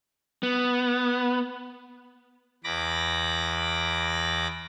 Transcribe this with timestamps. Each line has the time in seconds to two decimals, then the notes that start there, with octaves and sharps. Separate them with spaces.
0.43 B3
2.64 E2 B5 D6 A#6